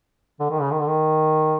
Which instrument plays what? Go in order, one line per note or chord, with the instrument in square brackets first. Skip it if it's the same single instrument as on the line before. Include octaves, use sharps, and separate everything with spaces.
[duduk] D3
D#3
C#3
D#3
D3
D#3